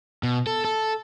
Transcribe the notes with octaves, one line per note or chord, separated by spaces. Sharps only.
B2
A4
A4